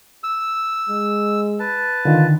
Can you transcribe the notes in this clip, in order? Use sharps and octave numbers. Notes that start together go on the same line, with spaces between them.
E6
G#3
B4 A5
D3 D#3 F4